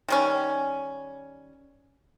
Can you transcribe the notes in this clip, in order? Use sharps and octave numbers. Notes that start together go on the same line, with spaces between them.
D#3 G3 C#4